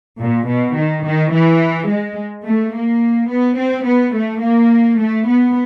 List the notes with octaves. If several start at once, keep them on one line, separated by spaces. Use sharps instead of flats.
A#2
B2
D#3
D#3
E3
G#3
A3
A#3
B3
C4
B3
A3
A#3
A3
B3